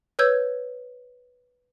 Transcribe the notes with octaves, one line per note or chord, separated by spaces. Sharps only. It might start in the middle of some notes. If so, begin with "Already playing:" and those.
B4 C#5 E6 G6 G#6